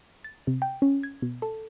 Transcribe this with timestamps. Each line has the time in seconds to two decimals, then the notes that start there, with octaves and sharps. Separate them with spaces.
0.24 A6
0.47 C3
0.62 G5
0.82 C#4
1.03 G#6
1.22 B2
1.42 A4